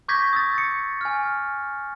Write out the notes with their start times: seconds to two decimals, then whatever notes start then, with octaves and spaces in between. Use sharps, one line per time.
0.08 C#6 D6 G6 G#6 A#6 B6
0.33 D#6 E6 A6
0.58 C#7
1.01 G#5 F6
1.25 F6